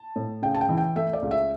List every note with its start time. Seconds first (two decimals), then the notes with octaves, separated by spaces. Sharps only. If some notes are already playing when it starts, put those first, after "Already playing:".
Already playing: A5
0.16 A2
0.42 C#3 G5
0.55 A5
0.61 G5
0.69 E3
0.77 G5
0.96 A3 E5
1.13 D5
1.22 C#2
1.31 E5